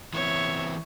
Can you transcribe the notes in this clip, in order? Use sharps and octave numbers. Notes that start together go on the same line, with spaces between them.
E3 B3 C4 C#5 E5